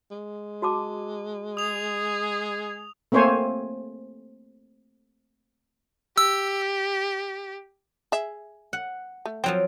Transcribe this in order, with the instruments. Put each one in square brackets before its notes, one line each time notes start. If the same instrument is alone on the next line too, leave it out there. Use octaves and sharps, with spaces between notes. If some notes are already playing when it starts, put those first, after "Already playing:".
[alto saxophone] G#3
[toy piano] F#4 A5 D6
[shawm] G#4 [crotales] D#6 F7
[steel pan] A3 A#3 C4 C5 C#5 G#5
[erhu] G4 [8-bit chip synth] E6
[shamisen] G#4 E5
[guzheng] F#5
[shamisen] A3
[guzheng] F3 F#3 C4 [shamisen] C5 G5